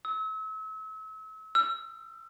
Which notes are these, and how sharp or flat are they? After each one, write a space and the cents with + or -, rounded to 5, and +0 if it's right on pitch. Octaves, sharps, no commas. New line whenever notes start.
E6 -35
E6 +35